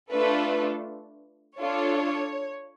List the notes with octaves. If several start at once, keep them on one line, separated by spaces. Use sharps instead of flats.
A3 D4 F4 A4 B4
D4 F4 A4 C#5